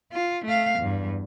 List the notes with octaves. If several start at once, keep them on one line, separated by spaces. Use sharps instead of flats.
F4
A3 F5
E2 G2